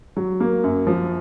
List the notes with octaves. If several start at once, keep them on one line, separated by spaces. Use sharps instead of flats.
F#3
A#3
F#2
F3